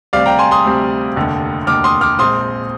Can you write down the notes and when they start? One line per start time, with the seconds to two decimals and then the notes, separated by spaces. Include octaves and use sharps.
0.13 D2 C3 G3 C4 D5 F5
0.26 G5 A#5
0.39 G#5 C6
0.51 C6 D#6
0.64 D2 C3 G3 C4
1.16 F1 D#2 D3
1.67 F1 D#2 D3 D6 F6
1.84 C6 D#6
2.01 D6 F6
2.19 A#1 A#2 G#3 C4 C6 D#6